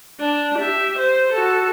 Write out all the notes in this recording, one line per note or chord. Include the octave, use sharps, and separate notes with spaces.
D4
G4 E5
C5
F#4 A4